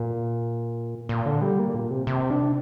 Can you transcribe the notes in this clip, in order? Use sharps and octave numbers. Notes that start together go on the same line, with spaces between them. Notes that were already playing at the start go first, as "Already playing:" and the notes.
Already playing: A#2
A#2
D3
G3
A#3
A#2
C3
C3
D4